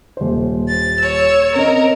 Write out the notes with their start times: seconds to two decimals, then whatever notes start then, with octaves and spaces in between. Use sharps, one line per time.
0.17 D#1 C5
0.67 A6
0.99 C#5 E6
1.55 C4 A#4 D#5